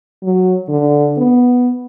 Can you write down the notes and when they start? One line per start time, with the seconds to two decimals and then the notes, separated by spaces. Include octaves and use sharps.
0.23 F#3
0.69 D3
1.18 B3